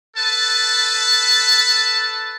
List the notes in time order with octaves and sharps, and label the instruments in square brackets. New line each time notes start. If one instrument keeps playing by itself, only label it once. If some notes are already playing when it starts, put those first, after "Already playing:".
[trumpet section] A4 B4 A5